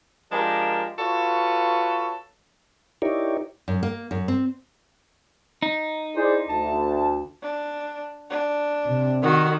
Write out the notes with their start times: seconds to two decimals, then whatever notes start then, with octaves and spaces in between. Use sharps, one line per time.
0.32 F3 G#3 D4 G4 A#4
0.99 F4 F#4 A4 B4 C#5
3.02 D#4 E4 G4 A#4 C#5 D5
3.68 F#2
3.83 A#3
4.11 F#2
4.28 C4
5.62 D#4
6.16 E4 G#4 C5 D5
6.49 D2 A5
7.42 D4
8.30 D4
8.86 C3
9.23 D#3 F#4